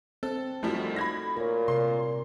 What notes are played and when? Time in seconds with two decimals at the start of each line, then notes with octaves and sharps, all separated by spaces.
0.23 C4 A4
0.63 F#2 F3 G3 A3 D#4 F#4
0.96 B5 G#6 A#6
1.37 A#2 A#4 C#5
1.68 C3 A#4 D5 C6